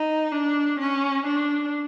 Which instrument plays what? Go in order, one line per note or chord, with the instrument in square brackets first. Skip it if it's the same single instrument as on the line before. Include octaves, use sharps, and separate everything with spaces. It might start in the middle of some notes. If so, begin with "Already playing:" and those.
Already playing: [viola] D#4
D4
C#4
D4